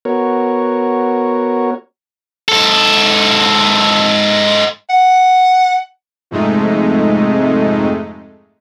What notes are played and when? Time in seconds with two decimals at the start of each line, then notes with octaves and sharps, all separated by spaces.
0.05 B3 F#4 A#4 C#5
2.49 G#2 A4
4.90 F#5
6.31 F2 G#2 C3 G#3 A3 D#4